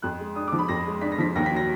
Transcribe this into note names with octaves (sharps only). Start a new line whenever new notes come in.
F2 F#6
G#3
D4 D#6
D6
F3
B5
F2 A#6
G#3
D4 B6
A#6
F3 B6
D#2 A#6
B6
F#3
A#6